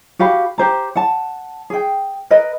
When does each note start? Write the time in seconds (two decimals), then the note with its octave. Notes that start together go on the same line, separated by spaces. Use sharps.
0.19 F#4 G4 F5 B5
0.58 G4 C5 A#5
0.96 F#5 A5
1.70 G#4 G5
2.31 A#4 B4 D#5